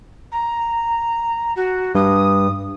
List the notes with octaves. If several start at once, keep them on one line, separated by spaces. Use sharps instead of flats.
A#5
F#4
G2 D#6